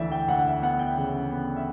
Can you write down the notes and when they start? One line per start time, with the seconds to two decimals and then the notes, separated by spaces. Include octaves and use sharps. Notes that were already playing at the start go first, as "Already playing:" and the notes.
Already playing: D2 E3 D5 E5
0.11 G5
0.28 D2 F#5
0.39 F#5
0.46 E5
0.62 B3 F#5
0.79 G5
0.97 C#3
1.31 B3
1.56 E5